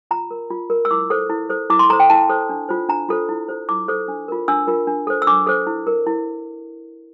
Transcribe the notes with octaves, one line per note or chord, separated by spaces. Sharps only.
F4 A#5
A#4
F4
A#4
E6
E4 D6
A4 C5
E4
A4 C5
E4 D6
C6
A4 C5 A#5
G5
E4 A5
A4 C5
D4
F4 A4 C5
D4 A#5
F4 A4 C5
E4
A4 C5
E4 D6
A4 C5
D4
F4 A#4
D4 E6
F4 A#4
D4
A4 C5
E6
D4 D6
A4 C5
E4
A#4
E4